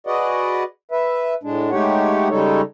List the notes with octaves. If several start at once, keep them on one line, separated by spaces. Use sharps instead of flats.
F#4 G#4 B4 D5 D#5 F#5
B4 E5
A2 G#3 D4
G#3 A3 D#4 G4 C#5 F#5
C#3 G3 G#3 D#4 A4 C#5